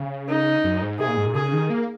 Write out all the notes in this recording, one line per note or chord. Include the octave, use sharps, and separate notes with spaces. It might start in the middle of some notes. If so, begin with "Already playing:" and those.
Already playing: C#3
D#4
F#2
G#2
C3 G#4
A#2
G#2
A#2
C#3 G#4
D#3
A#3